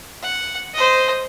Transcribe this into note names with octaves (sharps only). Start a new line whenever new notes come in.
F#5
C5 D#5